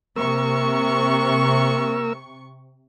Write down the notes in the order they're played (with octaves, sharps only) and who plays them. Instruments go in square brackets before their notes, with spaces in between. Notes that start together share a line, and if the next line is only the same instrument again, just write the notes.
[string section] C3 C#6 [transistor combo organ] A#3 A#4 E6